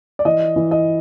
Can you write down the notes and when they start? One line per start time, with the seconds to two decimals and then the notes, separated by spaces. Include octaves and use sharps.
0.19 D5
0.25 E3 D#5
0.56 E3
0.71 D#5